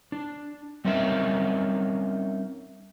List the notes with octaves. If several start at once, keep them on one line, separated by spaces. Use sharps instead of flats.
D4
G3 C4 C#4 D#4 A#4 E5